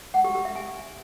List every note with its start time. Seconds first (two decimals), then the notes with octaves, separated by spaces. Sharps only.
0.14 F#5
0.24 G4
0.35 G4
0.45 E5
0.55 G#5